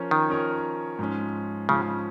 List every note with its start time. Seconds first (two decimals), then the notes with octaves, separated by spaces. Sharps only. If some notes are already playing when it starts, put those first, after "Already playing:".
Already playing: F3 C#4 A#4 C#5
0.11 D#3
0.29 F3 C#4 A#4 C#5
0.99 G#2 F3 C#4
1.69 G#2 C#3 F3 C#4